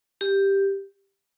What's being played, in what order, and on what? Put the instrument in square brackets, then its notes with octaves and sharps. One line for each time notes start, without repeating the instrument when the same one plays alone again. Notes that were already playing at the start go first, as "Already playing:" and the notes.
[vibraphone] G4